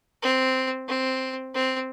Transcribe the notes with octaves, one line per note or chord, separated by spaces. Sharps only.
C4
C4
C4